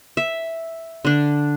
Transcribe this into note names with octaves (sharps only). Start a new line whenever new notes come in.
E5
D3 D4